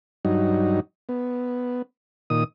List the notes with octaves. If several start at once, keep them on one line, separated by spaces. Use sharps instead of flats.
G2 F#3 D#4
B3
A#2 D#3 D#6